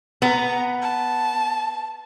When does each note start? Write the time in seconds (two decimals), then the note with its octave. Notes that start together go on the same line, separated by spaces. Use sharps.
0.22 B3 A#5
0.82 A5